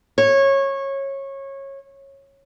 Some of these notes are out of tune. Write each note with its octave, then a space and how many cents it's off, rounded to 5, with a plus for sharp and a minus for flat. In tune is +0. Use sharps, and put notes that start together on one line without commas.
C#5 -20